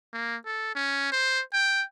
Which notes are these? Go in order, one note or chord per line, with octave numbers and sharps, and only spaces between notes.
A#3
A4
C#4
C5
G5